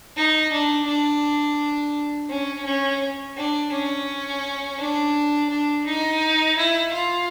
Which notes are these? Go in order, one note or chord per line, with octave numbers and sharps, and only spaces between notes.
D#4
D4
D4
C#4
C#4
D4
C#4
D4
D4
D#4
E4
F4